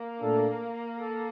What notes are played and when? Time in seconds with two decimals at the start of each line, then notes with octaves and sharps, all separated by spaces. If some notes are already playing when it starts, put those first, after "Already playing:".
Already playing: A#3
0.20 A#2 A3 D4 A4
0.99 A4